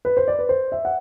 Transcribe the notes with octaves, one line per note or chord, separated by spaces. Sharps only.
B4
C5
D5
B4
C5
E5
F#5